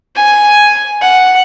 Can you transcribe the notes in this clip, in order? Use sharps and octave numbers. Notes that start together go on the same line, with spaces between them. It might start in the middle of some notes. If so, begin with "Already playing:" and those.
G#5
F#5